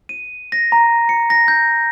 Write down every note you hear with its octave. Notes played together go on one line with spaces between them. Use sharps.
D#7
A#6
A#5
C#7
A#6
G6